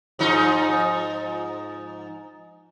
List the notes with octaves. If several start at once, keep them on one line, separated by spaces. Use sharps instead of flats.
G#2 F3 D#4